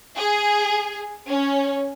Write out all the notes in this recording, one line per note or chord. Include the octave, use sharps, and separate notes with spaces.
G#4
C#4